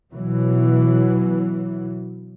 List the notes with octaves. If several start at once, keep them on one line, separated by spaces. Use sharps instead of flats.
B2 E3 F#3